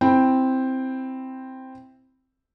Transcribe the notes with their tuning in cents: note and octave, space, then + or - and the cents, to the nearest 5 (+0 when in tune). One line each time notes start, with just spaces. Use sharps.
C4 +0 E4 +0 G5 +0